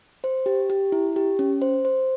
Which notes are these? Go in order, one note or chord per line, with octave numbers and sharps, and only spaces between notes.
C5
G4
G4
E4
G4
C#4
C5
C5